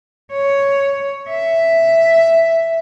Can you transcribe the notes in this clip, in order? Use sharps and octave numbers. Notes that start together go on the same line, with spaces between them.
C#5
E5